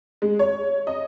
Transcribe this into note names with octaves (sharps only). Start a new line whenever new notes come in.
G#3
C#5
D#5